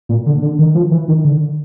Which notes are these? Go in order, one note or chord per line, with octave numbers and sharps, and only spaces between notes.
A#2
D3
D3
D#3
F3
E3
D#3
D3